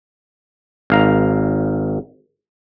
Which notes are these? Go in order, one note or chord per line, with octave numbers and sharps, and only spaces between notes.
G#1 F5 A#5